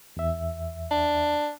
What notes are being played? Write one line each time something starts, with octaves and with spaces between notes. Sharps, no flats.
E2 E5
D4